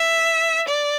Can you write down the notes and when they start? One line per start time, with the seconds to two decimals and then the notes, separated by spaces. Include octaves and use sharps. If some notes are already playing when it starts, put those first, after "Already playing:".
Already playing: E5
0.68 D5